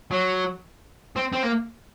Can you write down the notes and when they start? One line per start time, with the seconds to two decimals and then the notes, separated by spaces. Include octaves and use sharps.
0.11 F#3
1.16 C4
1.33 C4
1.43 A#3